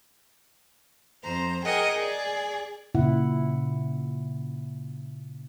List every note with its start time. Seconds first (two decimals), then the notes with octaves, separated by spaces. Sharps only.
1.22 F2 C5 A#5
1.65 G#4 A#4 D#5 F#5 G5
1.94 G#4 D5
2.95 A#2 C#3 E4 F#5